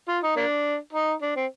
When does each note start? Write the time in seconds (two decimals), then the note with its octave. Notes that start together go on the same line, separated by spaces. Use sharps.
0.08 F4
0.23 D#4
0.36 A#3 D4
0.93 D#4
1.22 D4
1.36 C4